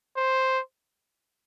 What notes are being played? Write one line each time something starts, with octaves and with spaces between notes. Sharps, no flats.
C5